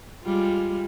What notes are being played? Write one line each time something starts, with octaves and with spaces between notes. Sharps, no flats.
G3 G#3 F4